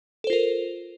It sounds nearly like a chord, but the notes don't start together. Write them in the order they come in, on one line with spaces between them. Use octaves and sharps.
A4 C5 F4 A#4